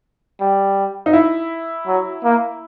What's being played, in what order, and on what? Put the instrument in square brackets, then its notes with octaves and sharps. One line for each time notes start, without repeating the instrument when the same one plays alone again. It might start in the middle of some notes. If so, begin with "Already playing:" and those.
[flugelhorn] G3
[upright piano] D#4
E4
[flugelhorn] F#3
A#3